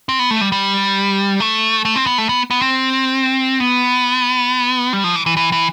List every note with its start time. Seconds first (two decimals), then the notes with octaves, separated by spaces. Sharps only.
0.09 C4
0.19 B3
0.31 A3
0.41 G3
0.52 G3
1.40 A3
1.85 A3
1.96 C4
2.06 B3
2.18 A3
2.29 B3
2.50 B3
2.62 C4
3.60 B3
4.93 G3
5.04 F3
5.15 E3
5.26 E3
5.37 E3
5.52 E3